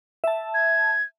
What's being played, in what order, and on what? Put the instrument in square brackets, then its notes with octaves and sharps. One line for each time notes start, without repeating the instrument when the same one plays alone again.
[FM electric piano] E5 A5
[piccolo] G#6